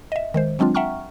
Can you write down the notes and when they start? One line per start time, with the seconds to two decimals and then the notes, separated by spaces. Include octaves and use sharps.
0.12 D#5 E5
0.34 D#3 G#3 C5
0.59 F#3 G#3 C4 D4 F4
0.75 E5 F#5 G5 A#5 C#6 F6